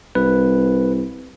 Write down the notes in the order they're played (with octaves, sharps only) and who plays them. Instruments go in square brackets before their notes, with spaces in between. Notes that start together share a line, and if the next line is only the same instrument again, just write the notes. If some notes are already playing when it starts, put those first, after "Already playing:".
[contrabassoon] C2 [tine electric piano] B4